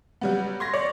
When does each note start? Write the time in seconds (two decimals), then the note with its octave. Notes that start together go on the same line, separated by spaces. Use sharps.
0.21 F#3 G3 B3
0.60 C6 G#6 A#6
0.74 C#5 D5